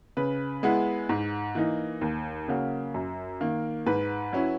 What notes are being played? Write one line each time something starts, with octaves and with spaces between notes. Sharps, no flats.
C#3 B4
G#3 B3 E4
G#2
E3 A#3 D#4
D#2
C#3 F#3 A#3
F#2
D#3 A#3
G#2 B4
F#3 C#4 E4